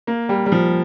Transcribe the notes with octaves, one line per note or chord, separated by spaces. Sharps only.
A#3
G3
G3
F3